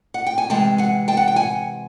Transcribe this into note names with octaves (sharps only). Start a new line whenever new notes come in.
F#5
G5
G#5
C3 E3 G#3 G5 A5
F#5 G#5
G5 A5
F#5
G5
F#5 G#5